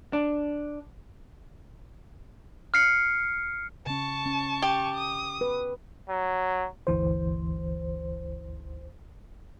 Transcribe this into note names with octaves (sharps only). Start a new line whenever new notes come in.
D4
F6 C7 C#7
C#3 C#4 A5 C#6
C#4
G4
D#6
B4
F#3
G1 D2 E3 C5